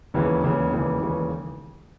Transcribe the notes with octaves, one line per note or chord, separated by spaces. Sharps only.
E1 D#2 C#3 E3
E1 D#2 C#3 E3
E1 D#2 C#3 E3
E1 D#2 C#3 E3